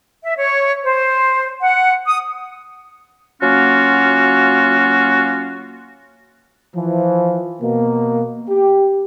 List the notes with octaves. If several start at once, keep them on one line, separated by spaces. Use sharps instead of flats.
E5
C#5
C5
F#5
D#6
F#3 A#3 C#4 F4 F#4
E3 F3
B2 A#3
G4